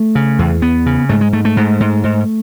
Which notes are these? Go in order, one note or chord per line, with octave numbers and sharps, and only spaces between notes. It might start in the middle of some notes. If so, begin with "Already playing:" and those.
Already playing: A3
C#3
E2
E2 B3
C#3
G#2 A3
G#3
G#2 A3
A3
G#2
G#2
G#2